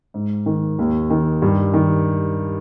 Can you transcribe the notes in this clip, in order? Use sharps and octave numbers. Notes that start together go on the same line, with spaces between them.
G#2
D#3
D#2
D#3
G2
D#3